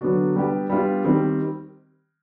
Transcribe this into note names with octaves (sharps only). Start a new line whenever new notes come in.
D3 F#3 B3 D4 F#4
G3 B3 D4 G4
G3 B3 D4 F4
D#3 G3 C4